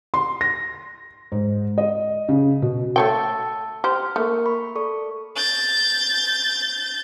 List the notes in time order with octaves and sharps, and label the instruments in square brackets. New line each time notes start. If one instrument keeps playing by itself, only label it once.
[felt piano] C6
A#6
G#2
D#5
C#3
B2
[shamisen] A3 C#5 G5 [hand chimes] A5 E6 A6
[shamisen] G4 C5 [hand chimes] F6
[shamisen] A3 [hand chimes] A#3 A#4 C#6
[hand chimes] B5 C#6
A4 D5 C#6
[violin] G6 A6